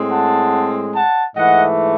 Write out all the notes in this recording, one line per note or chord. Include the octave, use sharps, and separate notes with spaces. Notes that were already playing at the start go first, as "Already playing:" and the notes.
Already playing: A2 G#3 C4
F#5 A5
F#5 A5
G#2 E3 A3 D#5 F#5